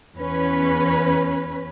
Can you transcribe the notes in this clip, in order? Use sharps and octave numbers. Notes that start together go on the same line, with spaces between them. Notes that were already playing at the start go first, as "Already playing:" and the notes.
E2 C#4 B4